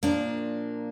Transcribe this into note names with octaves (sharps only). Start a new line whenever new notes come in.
A#2 F3 A#3 D4